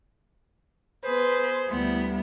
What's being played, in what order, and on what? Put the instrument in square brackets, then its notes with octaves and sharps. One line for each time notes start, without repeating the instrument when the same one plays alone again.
[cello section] B3 [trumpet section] G#4 C5 [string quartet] B4
[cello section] D2 G3 E4 [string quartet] B3